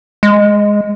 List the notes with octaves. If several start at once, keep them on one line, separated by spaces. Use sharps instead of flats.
G#3